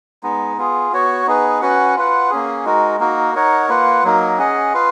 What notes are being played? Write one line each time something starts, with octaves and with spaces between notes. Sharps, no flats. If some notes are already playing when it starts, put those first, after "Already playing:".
G#3 B3 D#4
B3 F4 G#4
B3 F#4 C#5
B3 D#4 G#4 B4
C#4 F#4 B4 F#5
F4 B4 F#5
A#3 C#4 G#4
G#3 D#4 F#4 A#4
A#3 D#4 F#4 A#4
D#4 A#4 C#5 F#5
A#3 F4 B4 F#5
F#3 A#3 D#4 A#4
C#4 G#4 D#5 F#5
F4 B4 F5